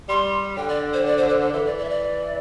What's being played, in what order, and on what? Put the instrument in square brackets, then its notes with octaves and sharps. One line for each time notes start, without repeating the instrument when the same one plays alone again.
[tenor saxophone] G3 [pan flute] C6
[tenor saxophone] D3 [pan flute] G5
[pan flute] D5
C5
D5
C5
C5
A4
[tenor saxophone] E3 [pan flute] A4
[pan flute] D5
D5
E5
D5